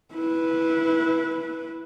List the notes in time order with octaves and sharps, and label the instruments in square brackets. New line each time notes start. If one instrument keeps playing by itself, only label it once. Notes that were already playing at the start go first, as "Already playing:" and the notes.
[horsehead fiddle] E4 B4